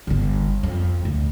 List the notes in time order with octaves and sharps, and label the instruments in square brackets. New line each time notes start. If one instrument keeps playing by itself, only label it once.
[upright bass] G1 D3
F2
D2